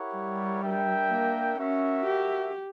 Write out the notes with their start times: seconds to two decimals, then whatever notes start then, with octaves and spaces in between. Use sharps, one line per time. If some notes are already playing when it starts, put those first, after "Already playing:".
Already playing: E4 G4 A#4 C#5 F#5
0.14 G3
0.63 D4 A#4 E5 G5
1.10 A#3
1.58 C#4 F#4 A#4 E5
2.06 G4